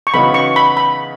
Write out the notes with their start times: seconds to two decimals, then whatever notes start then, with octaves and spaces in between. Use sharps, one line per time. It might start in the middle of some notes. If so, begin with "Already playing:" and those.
0.07 C#6
0.13 C#3 E3 B3 D#4 F#4 B5
0.34 C#6
0.56 B5
0.77 B5